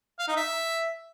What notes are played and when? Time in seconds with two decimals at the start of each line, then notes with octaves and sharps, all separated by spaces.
0.19 F5
0.28 D#4
0.37 E5